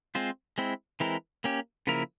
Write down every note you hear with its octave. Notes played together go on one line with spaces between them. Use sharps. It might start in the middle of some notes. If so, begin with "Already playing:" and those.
G#3 C4 F4 C5
G#3 C4 E4
E3 G#3 C4 E4 A#4
A#3 C#4 G4
C#3 F3 A#3 E4 A#4